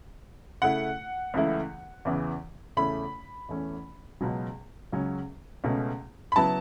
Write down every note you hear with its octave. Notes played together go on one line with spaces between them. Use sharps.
C#3 A3 E4 F#5
C#2 C#3 E3 A3 E4
E2 C#3 E3 B3
E2 C#3 A3 C#4 E4 B5
E2 E3 A3 C#4
C#2 B2 F#3
C#2 C#3 F#3 C#4
C#2 B2 A3 C#4
B5
C#3 F#3 B3 E4 A5